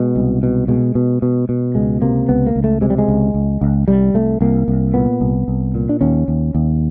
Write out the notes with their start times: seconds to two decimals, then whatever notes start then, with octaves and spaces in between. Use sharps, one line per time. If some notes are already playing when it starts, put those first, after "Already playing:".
Already playing: B2 G#3
0.16 C2
0.43 B2
0.68 B2 G#3
0.95 B2
1.22 B2
1.49 B2
1.75 C#2 G#3
2.01 C3 A#3
2.29 C#2 B3
2.47 A#3
2.56 C#2
2.64 A3
2.81 C3 G#3
2.90 G3
2.98 G#3
3.08 C#2
3.34 C#2
3.61 C#2
3.88 C2 G3
4.14 C2 A3
4.41 C2 A#3
4.68 C2
4.94 A#2 B3
5.20 C2
5.48 C2
5.75 A#2
5.89 D4
6.01 D#2 C#4
6.28 D#2
6.55 D#2